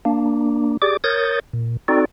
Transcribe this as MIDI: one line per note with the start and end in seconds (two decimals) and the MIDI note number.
0.05 0.77 58
0.05 0.77 62
0.82 0.97 67
0.82 0.97 68
0.82 0.97 74
0.82 0.97 86
1.04 1.40 70
1.04 1.40 73
1.04 1.40 87
1.04 1.40 91
1.04 1.40 93
1.53 1.77 46
1.88 2.05 60
1.88 2.05 63
1.88 2.05 66
1.88 2.05 69
1.88 2.05 74